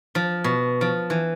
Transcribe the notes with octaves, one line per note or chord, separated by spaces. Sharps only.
F3
B2
F3
E3